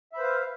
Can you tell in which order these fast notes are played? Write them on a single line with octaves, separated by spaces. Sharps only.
E5 B5 C5 B4 F5